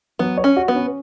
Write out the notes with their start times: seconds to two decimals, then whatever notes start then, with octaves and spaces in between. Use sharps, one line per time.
0.19 F#3 B3
0.37 C#5
0.44 C#4
0.57 F#4
0.68 B3
0.75 C#4